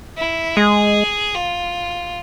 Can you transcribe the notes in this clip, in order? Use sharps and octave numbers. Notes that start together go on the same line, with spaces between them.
E4
G#3 G#4
F4